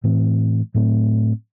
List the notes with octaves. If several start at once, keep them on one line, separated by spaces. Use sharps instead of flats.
A2 E3 A3 C4
A2 F#3 A3 C4